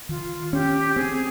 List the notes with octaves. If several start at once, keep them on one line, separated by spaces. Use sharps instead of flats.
D#3 F4
C#4 G4
C4 G#4